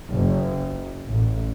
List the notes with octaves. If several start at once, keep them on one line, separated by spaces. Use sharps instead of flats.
F#1
A1